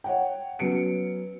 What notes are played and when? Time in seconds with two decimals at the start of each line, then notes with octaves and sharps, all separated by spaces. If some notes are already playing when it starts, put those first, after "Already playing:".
0.04 C#5 F#5 G5
0.59 F#3 B3 C#4 C#7 D7